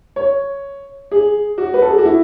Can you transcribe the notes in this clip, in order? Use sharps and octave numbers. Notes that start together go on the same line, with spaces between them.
C#5
G#4
F#4
B4
A4
G#4
F#4
E4